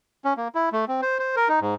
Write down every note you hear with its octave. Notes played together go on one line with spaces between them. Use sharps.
C#4
A#3
E4
A3
C4
C5
C5
A#4
D#4
G#2